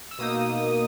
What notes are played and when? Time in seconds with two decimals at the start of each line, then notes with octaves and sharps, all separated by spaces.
0.11 E6
0.19 B2 A#3 D#4 D#6